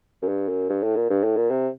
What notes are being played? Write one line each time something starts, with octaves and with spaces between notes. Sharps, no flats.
F#2
G2
F#2
G2
A2
A#2
G2
A2
A#2
C3